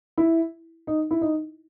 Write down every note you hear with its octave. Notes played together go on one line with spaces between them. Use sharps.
E4
D#4
E4
D#4